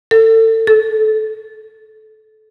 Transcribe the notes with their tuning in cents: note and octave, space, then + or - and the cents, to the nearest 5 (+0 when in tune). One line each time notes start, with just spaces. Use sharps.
A4 +30
A4 -25